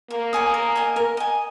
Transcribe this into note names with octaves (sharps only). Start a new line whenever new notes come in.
A#3 A#4
C#5 G#5 D#6
A#4
D#5 G#5
A#4
D#5 G#5